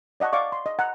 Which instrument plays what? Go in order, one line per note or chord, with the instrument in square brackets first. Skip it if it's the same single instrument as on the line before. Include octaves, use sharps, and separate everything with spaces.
[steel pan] D5 D#5 F#5 A5 C#6
D5 F5 C#6 D6
C6
D#5
F#5 A#5